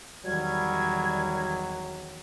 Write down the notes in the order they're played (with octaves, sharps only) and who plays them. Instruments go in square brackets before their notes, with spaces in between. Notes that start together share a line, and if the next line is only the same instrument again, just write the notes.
[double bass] E2 D#3 [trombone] F#3 [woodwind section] G3 [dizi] G#6